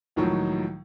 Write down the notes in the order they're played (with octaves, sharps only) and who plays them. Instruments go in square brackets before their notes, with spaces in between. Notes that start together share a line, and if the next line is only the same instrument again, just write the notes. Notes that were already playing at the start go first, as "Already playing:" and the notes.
[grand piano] C#2 A2 D#3 F3 F#3